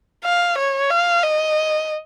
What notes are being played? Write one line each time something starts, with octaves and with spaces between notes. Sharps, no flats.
F5
C#5
F5
D#5